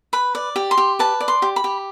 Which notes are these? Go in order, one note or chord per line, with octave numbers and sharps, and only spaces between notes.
B4 B5
D5
G4
C6
G4
B4 A5
D5
C6
G4
B5
G4